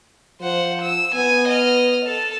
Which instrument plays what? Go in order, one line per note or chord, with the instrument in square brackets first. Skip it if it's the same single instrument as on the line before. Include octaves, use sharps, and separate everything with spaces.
[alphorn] F3 [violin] C5 F#5
[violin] E6
[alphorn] B3 [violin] G#5
[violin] D#5 F6
A4 A5